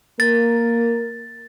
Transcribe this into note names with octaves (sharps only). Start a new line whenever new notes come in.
A#3 A#4 A6